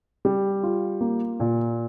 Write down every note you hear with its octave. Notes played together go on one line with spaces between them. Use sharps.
G3
F4
A#3
A#2